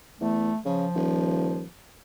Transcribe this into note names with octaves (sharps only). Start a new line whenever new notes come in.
E2 A3
C#3 F3
D#1